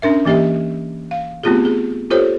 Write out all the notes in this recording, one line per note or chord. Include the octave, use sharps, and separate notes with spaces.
C#4 D4 A#4 E5
E3 A#3 G4 D#5 E5
F5
A3 B3 C4 F4 G4 G#4
G#4
F4 G4 A4 C5 C#5